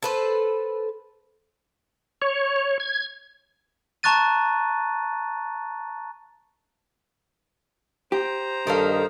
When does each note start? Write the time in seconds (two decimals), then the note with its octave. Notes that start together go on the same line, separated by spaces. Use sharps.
0.03 A4 B4 C5
2.22 C#5
2.80 G#6
4.03 A5 A#5 C#6 F#6 A6 D#7
8.12 G4 C5 A#5
8.67 G2 D#3 A4 A#4 D#5 F5